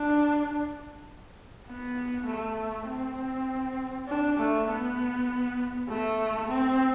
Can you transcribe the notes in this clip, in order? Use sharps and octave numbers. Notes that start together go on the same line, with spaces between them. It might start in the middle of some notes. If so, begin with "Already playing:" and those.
Already playing: D4
B3
A3
C4
D4
A3
B3
A3
C4